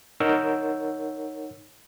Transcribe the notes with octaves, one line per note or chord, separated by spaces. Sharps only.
D#4 A#4 C#5 F#5 E6 G6